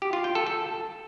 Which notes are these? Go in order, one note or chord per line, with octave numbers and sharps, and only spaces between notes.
G4
F4
G5
A4
A4